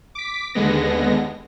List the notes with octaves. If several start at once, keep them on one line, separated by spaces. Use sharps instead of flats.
D6 B6
D#2 D3 G#3 B3 A#6